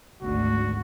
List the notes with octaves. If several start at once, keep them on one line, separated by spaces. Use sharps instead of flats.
G#1 D2 F#4